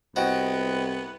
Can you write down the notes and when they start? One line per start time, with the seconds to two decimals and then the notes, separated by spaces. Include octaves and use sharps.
0.16 C2 B3 F#4 C5 D#5 G5